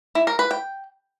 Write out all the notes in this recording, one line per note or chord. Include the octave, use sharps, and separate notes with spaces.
E4
A#4
B4
G5